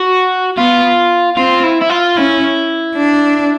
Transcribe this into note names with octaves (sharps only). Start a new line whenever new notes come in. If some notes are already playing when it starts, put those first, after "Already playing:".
Already playing: F#4
B3 F4
C4 F4
E4
E4
F4
C#4 E4
D4